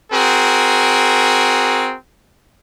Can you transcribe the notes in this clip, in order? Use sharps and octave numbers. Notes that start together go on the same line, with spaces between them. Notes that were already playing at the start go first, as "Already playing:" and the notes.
C4 F#4 G#4 A#4